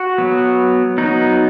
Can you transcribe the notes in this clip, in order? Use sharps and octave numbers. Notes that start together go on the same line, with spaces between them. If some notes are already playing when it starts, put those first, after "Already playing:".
Already playing: F#4
F#3 B3
F#3 B3 D#4